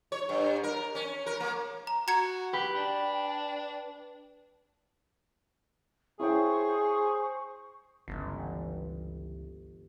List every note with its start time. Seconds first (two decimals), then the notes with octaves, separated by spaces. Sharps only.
0.12 C#5
0.29 G2
0.63 A#4
0.95 C#4
1.26 A#4
1.40 A#3
1.87 A#5
2.08 F#4 A#5 G#6 C#7
2.53 G4 B4 G5
2.76 D4
6.20 E4 G#4 C5 C#5 G5 C#6
8.08 G1 C#2 E3